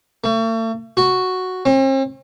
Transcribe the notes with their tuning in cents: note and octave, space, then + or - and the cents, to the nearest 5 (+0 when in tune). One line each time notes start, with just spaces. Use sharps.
A3 +40
F#4 +0
C4 +45